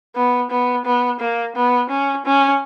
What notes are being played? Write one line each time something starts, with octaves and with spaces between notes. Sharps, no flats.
B3
B3
B3
A#3
B3
C#4
C#4